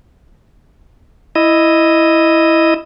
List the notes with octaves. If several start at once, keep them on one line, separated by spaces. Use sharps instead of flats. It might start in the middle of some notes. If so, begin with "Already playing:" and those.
E4 D#5